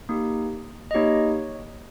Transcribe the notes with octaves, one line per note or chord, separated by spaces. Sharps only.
A#3 D#4 G4
D#5
A#3 D#4 G4 C#5